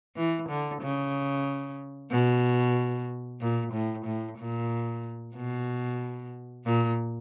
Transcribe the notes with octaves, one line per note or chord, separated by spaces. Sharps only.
E3
D3
C#3
B2
A#2
A2
A2
A#2
B2
A#2